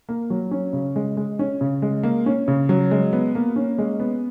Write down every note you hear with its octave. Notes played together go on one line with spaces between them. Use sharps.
A#3
F#3
C#4
C#3
G#3
G#3
C#4
C#3
G#3
A#3
C#4
C#3
F#3
G#3
B3
A#3
C#4
G#3
B3